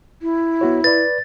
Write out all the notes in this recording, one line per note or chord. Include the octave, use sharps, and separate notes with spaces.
E4
B3 F#4 C#5
B4 D5 A6